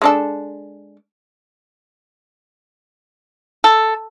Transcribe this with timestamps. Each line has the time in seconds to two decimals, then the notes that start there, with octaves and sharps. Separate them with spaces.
0.02 G#3 D4 A4
3.64 A4